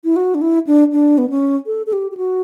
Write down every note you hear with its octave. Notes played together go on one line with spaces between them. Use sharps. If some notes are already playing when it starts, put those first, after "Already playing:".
E4
F#4
D4
E4
D4
D4
B3
C#4
A4
A4
G4
G4
F#4